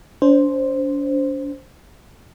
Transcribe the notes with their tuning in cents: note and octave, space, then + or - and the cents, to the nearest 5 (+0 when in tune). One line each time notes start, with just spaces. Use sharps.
D4 -45 C5 +0